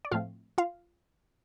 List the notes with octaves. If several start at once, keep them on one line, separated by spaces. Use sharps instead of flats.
D5
A2 F3 A3 C4 F4 F5
F4 F5